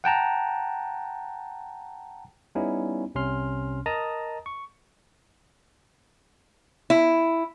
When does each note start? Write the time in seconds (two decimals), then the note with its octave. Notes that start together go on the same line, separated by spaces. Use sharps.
0.04 F#5 G5 A5 A#5
2.55 G3 B3 C#4 D#4 E4
3.15 C2 C3 C#4 C6 F6
3.86 A#4 D#5 A5 A#5 D#6
4.46 C#6
6.90 E4